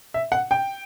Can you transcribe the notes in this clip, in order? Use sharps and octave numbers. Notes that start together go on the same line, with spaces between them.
E5
F#5
G5